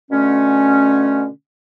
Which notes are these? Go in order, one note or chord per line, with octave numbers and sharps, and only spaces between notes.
B2 D3 A3 C#4